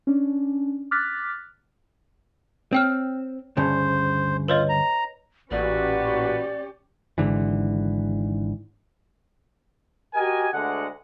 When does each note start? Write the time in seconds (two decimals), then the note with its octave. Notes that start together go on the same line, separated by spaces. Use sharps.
0.07 C#4 D4
0.91 D6 F6 F#6 A6 B6
2.73 C4 C#5 G5 F6
3.57 D2 G2 C#3 C5
4.48 F4 B4 C#5 D#5
4.69 A#5
5.51 A1 A#2 C#4 F#4 G4 B4 D5
7.18 G#1 G#2 D3 E3
10.14 F#4 G4 A#4 D#5 G#5
10.54 D2 D3 G#3 F#5